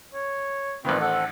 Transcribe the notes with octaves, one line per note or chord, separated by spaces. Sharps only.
C#5
A1 D#3 C4 F4 B4
C4 A4 F#5